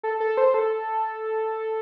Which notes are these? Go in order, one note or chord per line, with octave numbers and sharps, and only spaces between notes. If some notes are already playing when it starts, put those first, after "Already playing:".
A4
A4
C5
A4